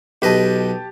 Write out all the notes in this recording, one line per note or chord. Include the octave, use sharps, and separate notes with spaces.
B1 G4 B4 D#5 A5